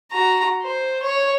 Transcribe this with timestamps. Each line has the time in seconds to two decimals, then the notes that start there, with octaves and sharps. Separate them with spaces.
0.12 F#4 A#5
0.62 C5
1.03 C#5